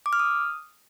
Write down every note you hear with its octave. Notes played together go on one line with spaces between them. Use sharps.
D6
F6
D#6